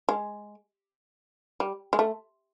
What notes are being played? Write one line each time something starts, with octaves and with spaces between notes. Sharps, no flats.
G#3
G3
G#3
A3